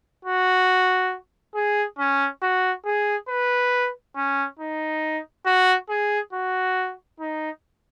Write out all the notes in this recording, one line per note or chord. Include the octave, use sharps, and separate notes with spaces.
F#4
G#4
C#4
F#4
G#4
B4
C#4
D#4
F#4
G#4
F#4
D#4